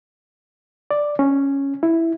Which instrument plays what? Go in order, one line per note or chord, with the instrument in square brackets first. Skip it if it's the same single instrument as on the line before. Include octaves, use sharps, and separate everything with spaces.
[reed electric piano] D5
C#4
E4